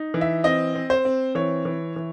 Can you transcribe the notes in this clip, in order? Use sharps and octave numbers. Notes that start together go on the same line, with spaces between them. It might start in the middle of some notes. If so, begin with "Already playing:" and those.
Already playing: D#4
E3
E5
C4 D#5
C4
C5
C4
E3 C#5
E3
E3